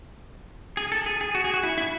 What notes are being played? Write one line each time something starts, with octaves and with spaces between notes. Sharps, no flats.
G#4
A4
G#4
G#4
F#4
G#4
F#4
E4
E4